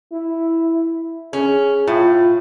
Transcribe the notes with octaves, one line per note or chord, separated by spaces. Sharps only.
E4
C#4 G#4
A2 F4